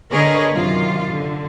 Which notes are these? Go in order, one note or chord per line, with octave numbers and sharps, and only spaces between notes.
D3 G#4 A#4 B4 C#5 D#5
F#2 C3 D#3 F4
D3